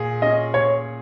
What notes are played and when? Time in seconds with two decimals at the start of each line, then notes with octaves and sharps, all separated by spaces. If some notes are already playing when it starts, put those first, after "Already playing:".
Already playing: A#2 G#4
0.22 C#4 D#5
0.54 A#2 C#5